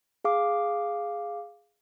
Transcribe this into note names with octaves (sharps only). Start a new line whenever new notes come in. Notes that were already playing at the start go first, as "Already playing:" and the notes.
G#4 F5 D6